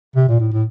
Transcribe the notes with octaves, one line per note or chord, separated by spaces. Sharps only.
C3
A#2
A2
A2